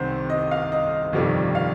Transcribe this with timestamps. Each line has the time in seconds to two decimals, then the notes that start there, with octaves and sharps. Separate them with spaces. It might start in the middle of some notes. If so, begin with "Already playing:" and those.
Already playing: C2 C3 D#3 C4 C5
0.30 D#5
0.51 F5
0.72 D#5
1.13 G1 F2 C3 D#3 G3
1.55 F5